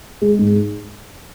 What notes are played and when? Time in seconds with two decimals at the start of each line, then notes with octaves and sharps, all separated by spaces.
0.22 G#3
0.39 G#2